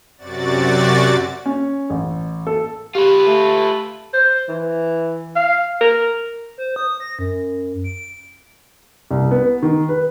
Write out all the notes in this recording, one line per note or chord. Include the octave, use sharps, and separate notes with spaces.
F#2 C3 F#4 D5 A6
C#4
A1
A4
F4 G4 B4
A3
C5
E3
F5
A#4
C5
D#6
A#6
F#2
D7
C2
B3
D#3
B4